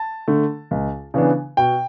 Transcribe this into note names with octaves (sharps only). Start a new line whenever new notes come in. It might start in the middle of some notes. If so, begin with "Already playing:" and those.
Already playing: A5
D3 A3
C#2
C#3 E3 B3 D4
B2 G5